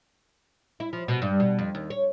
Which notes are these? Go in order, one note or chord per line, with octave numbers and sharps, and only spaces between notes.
E4
F3
B2
G2
B2
F2
D#2
C#5